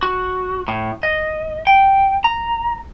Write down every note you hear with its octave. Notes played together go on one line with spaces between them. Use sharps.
F#4
A2
D#5
G5
A#5